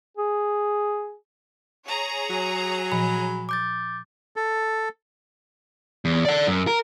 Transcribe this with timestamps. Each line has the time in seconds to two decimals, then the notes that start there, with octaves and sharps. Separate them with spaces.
0.17 G#4
1.86 G#4 C#5 A#5
2.30 F#3
2.91 A#2 F3 G#5 B5
3.49 D6 G6 A6
4.36 A4
6.05 E2
6.25 D5 F#5
6.47 F#2
6.67 A#4